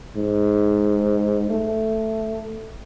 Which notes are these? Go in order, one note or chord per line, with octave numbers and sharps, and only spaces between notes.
G#2
A3